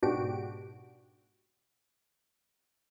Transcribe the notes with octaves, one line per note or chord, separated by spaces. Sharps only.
G#2 B2 D4 F#4 G4 D7